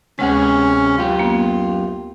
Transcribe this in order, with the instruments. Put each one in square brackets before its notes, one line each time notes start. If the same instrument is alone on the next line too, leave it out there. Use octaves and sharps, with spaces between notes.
[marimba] D2 G#3 [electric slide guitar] C3 B3 G#4 [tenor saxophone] C#4
[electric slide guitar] F#2 G4 [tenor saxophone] F4
[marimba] A#3 B3